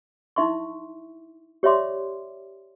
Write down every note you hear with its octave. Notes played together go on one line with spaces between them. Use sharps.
D#4 E4 E5 C6 C#6
G4 C#5 D5 E5 C6 D6